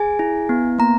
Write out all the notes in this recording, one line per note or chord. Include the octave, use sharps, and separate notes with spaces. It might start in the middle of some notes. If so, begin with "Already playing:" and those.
Already playing: G#4 G#5
E4
B3
A#3 A#5